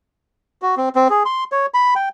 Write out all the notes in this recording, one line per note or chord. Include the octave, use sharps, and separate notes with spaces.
F#4
C4
C4
G#4
C6
C#5
B5
G5